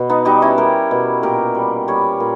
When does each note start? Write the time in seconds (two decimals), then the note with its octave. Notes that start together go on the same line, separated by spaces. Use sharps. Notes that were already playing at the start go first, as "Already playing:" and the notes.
Already playing: B2
0.10 B3 D#4
0.25 G3 D#4 G4
0.42 C#4 E4
0.58 G3 G4 A#4
0.91 B2
1.23 A#2 G4 A#4
1.55 G3
1.88 G3 A#4 C#5
2.20 A#2